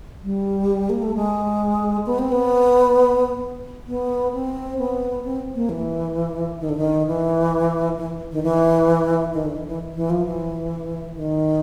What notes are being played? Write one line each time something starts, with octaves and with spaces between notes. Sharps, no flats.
G3
A#3
A3
G#3
B3
C4
B3
B3
C4
B3
C4
A#3
E3
D#3
D3
D#3
E3
E3
D#3
E3
D#3
D3
E3
E3
E3
F3
E3
D#3